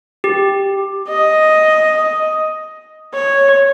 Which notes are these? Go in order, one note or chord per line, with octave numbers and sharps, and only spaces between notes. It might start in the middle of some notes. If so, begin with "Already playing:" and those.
G4
D#5
C#5